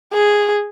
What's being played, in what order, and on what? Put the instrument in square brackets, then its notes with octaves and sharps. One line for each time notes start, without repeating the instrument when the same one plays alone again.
[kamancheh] G#4